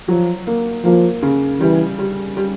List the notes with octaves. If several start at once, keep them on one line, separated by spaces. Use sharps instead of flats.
F3 F#3
A#3
F3 A#3
C#3
E3 G3
G3
G3